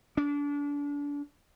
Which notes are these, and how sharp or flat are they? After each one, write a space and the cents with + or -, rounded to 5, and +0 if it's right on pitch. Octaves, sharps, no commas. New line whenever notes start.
D4 -30